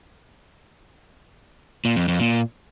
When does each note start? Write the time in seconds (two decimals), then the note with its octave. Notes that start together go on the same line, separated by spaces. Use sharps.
1.85 A#2
1.96 F2
2.08 F2
2.20 A#2